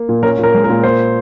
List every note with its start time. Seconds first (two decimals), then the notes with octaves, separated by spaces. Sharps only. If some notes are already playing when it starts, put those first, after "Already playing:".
Already playing: A#3
0.09 A#2
0.23 C#4 A#4
0.39 A#2 A#4
0.54 G#3
0.64 A#4
0.69 A#2
0.83 A#3 C5